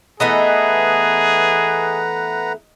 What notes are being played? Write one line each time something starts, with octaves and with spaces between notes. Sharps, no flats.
E3 A3 B3 G#4 B4 D#5 F#5 A#5